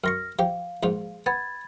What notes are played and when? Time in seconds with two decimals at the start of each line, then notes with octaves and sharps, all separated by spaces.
0.04 F#2 C6 C#6 F6 A#6
0.39 F3 G4 F5
0.83 A#1 G#2 F4
1.26 B3 B5 G#6 A6